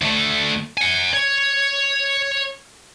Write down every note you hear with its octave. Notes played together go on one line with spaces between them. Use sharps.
D2 A3
F#5 G#5
C#5